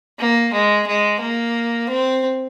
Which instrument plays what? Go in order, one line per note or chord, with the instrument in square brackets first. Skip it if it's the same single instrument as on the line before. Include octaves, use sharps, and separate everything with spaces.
[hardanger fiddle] A#3
G#3
G#3
A#3
C4